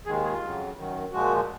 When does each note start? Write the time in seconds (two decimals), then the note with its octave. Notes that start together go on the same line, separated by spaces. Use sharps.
0.06 D#2 D#3 G#3 G#4
0.24 G#4
0.32 F4
0.41 F2 C#3 F#3
0.77 F#2 D#3 F#3
1.12 A#2 F3 G#3 F#4